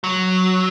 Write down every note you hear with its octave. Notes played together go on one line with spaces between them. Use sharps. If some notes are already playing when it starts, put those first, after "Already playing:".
F#3